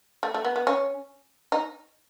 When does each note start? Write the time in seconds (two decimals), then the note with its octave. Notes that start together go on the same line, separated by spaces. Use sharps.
0.23 A3
0.34 A3
0.45 B3
0.56 B3
0.67 C#4
1.52 D#4